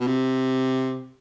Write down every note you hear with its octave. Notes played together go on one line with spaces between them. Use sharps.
B2
C3